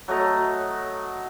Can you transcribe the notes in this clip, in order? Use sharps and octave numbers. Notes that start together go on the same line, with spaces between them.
F#3 A3 D#5 A#5